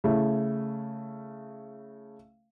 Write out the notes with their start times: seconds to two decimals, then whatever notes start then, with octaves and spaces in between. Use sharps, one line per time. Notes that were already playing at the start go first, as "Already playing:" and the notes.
0.04 C#3 A3 E4